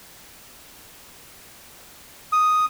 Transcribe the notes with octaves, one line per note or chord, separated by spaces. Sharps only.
D#6